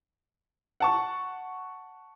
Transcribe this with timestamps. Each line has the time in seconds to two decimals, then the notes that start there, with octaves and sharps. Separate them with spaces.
0.80 F#5 A5 C#6